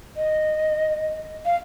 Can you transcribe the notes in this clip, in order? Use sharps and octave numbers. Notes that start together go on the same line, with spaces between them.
D#5
F5